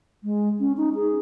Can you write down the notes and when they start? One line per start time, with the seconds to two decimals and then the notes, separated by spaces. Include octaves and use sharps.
0.24 G#3
0.60 C#4
0.77 D#4
0.95 G#4